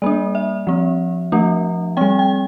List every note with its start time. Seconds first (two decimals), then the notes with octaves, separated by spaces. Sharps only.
0.02 G3 A#3 D4 D5
0.35 E5
0.67 F3 C4
1.32 F3 A3 D4
1.97 G3 C4 G5
2.19 G5